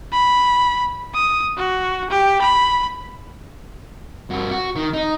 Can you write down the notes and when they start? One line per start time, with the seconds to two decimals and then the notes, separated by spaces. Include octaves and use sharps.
0.13 B5
1.14 D#6
1.57 F#4
2.10 G4
2.42 B5
4.30 G2 F#4
4.51 F#4
4.76 D#3
4.94 D#4